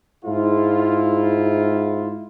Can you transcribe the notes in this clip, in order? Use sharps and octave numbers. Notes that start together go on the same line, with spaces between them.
G#2 E4 F4